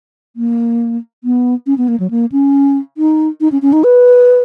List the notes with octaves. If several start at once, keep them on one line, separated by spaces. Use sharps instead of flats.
A#3
B3
C#4
B3
A#3
F#3
A#3
C#4
D#4
D#4
C#4
C#4
D#4
B4